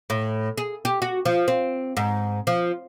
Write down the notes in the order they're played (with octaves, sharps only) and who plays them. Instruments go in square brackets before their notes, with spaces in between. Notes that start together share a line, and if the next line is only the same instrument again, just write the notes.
[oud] A2
G#4
G4
F#4
F3
C4
G#2
F3